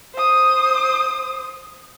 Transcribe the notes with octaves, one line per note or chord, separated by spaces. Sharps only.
C5 D#6